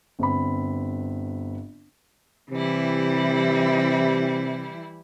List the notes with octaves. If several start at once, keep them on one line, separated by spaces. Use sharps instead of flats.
G1 C4 B5
C3 E3 G3 E4